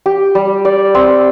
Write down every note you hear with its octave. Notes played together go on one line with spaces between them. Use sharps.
G4
G3
D5
C4